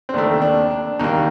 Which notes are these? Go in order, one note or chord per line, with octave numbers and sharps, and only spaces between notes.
C4
D#2 D#3 A3 D4
D4
D4
D#2 D#3 G3 A#3 D#4